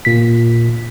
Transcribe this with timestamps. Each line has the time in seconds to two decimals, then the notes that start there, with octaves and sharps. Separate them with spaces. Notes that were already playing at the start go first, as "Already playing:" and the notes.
0.05 A#2 B6